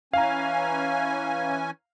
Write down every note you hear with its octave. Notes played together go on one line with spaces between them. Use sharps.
E3 C#4 F5 G#5 A#5